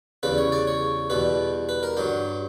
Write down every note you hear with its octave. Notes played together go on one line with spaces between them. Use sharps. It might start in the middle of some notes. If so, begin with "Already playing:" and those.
E2 C#3 G3 B4
C#5
D5
C#5
E2 B2 G3 B4
B4
A#4
G2 F#3 G4